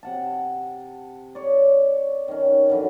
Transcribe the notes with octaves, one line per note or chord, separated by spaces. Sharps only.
C3 F#5 A5
C#5 D5
D#3 C#4
D3 E3 F#3